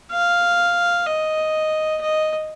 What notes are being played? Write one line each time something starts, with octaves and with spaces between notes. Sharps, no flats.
F5
D#5
D#5